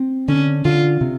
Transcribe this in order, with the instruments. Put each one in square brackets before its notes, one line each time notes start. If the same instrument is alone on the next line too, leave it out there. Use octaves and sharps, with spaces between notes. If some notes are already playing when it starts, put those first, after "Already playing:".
Already playing: [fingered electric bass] C4
[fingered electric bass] D3 [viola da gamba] C#4
[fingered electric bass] D3 [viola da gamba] F4
[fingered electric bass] C3